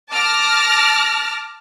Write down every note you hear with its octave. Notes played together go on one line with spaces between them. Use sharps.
A5 D6 F6 A#6